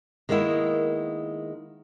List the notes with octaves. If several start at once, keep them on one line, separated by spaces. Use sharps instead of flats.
D#3 G#3 A#3 B3 E4